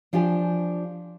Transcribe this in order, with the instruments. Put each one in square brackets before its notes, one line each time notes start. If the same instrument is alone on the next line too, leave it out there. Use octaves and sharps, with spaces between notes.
[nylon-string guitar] F3 D4 F4 G4 G#5